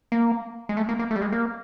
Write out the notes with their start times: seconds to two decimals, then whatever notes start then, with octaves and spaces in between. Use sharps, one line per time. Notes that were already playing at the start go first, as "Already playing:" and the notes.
0.12 A#3
0.69 G#3
0.77 A3
0.89 A#3
0.99 A#3
1.11 A3
1.16 G3
1.22 G#3
1.32 A#3